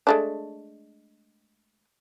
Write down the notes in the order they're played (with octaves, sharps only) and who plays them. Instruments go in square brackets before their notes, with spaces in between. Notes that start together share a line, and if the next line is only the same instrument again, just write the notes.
[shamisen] G#3 A3 D4